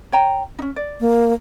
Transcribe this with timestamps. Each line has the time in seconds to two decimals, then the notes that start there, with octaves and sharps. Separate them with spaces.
0.12 C#5 G5 A#5
0.59 C#4 D#4
0.76 D5
1.00 A#3